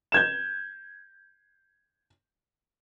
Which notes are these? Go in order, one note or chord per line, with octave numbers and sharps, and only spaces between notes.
G6 G#6 E7